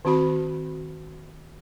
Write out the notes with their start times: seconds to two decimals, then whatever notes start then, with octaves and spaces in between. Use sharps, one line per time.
0.05 D#3 C4 F#4 B5